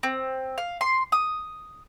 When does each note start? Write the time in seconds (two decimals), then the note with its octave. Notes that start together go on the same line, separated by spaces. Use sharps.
0.03 C4
0.58 F5
0.81 C6
1.12 D#6